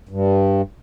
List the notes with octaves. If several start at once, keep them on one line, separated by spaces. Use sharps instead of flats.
G2